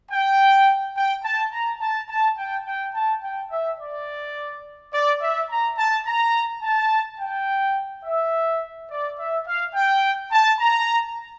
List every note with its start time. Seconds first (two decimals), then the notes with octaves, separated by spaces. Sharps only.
0.11 G5
0.96 G5
1.24 A5
1.53 A#5
1.81 A5
2.09 A5
2.38 G5
2.66 G5
2.95 A5
3.23 G5
3.51 E5
3.79 D5
4.93 D5
5.22 E5
5.50 A#5
5.78 A5
6.06 A#5
6.63 A5
7.19 G5
8.05 E5
8.90 D5
9.18 E5
9.46 F5
9.75 G5
10.32 A5
10.60 A#5